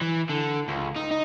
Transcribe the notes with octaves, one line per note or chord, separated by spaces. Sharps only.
E3
D3
C#2
D#4
D#4